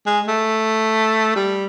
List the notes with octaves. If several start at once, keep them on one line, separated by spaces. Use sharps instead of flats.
G#3
A3
G3